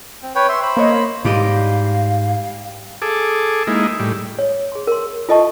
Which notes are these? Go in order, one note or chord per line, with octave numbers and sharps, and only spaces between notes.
C4
B4 C#5 G5
E5 C6
C5 B5
A#3 C#5 D#5
G#2 G3 G4 D#5 F5
G#4 A4 D6
G#3 A#3 D#4 E4
A2 G3
C#5
G#4 C6
A#4 C6
F4 A4 D#5 E5 A5 C#6